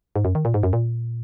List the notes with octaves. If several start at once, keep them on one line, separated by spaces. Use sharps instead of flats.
G#2
F#2
D#3
A#2
G#2
F#2
A#2